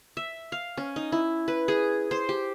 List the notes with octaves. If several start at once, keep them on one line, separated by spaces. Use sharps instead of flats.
E5
F5
C#4
D#4
E4
B4
G#4
C5
G4